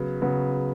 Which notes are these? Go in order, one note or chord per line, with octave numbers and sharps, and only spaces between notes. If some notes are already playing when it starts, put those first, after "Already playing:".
Already playing: C#3 F#3 B3
C#3 F#3 B3